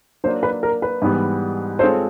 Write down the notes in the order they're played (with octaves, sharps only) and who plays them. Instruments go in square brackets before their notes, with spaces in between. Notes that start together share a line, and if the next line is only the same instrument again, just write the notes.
[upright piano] F#3 A#3 D4 [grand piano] C5
[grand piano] B4
A#4
B4
[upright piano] G#2 E3 G3 B3
[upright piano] G#3 C4 F4 A4 C#5 [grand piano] C5